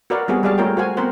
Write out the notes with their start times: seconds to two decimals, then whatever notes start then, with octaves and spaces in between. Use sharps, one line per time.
0.10 F#4 A#4 B4 D5 F5 F#5
0.28 G3 B3 C4 F#4 G#4 F5
0.43 G3 G#3 G#4 D5 F5 A5
0.58 A3 A#3 F4 A#4 C#5 G5
0.77 F#4 C5 F5 G#5
0.97 B3 C4 A#4 C5 F#5